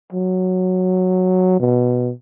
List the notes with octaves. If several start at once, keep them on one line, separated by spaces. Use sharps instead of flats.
F#3
B2